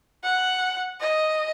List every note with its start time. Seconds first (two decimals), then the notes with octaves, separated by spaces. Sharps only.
0.24 F#5
1.01 D#5